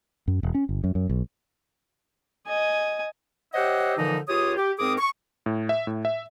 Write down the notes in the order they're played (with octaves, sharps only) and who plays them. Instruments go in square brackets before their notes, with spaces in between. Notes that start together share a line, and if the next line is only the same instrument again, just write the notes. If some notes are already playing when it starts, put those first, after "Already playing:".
[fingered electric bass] F#2
E1
C#4
G1
F#2
F#2
B1
[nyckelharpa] D#5 G#5
[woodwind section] G4 C5 C#5 D#5 E5 F#5
A#2 D3 E3 F3 D#4
C#2 F4 G4 C#5 D#6
G4
G#2 C4 G#4 A#4 D6 D#6
C#6
[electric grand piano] A2
E5
A2
E5